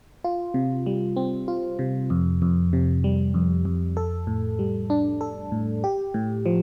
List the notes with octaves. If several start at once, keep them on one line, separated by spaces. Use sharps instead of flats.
F4
C3
G3
C4
F4
C3
F2
F2
C3
G3
F2
F2
A4
A2
G3
D4
A4
A2
G4
A2
F3